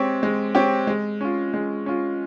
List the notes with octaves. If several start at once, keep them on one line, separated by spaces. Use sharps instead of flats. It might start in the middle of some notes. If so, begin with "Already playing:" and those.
Already playing: G#3 C4 G4 C#5
G#3
C4 G4 C#5
G#3
C#4 F4
G#3
C#4 F4